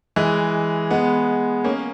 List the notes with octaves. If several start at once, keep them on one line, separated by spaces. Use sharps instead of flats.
E3 G#3
G#3 B3
A#3 C#4